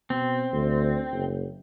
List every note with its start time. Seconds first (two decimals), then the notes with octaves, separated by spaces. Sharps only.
0.10 B2 C4
0.52 D2
1.12 F#1